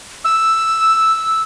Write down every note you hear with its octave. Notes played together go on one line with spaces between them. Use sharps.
E6